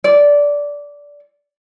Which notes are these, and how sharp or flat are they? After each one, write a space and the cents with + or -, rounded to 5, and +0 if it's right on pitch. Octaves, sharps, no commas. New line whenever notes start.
D5 -15